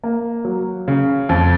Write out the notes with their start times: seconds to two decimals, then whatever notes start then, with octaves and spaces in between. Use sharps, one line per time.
0.04 A#3
0.45 F#3
0.88 C#3
1.29 F2